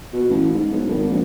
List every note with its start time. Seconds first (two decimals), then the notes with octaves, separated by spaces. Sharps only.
0.13 B2
0.29 A1
0.53 G#2
0.71 B1
0.89 G#1
1.08 A#1